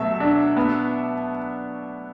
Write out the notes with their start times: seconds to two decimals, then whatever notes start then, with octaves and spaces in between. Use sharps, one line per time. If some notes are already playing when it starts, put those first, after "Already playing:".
Already playing: B2 F#3 A3 E5
0.20 D4
0.56 B3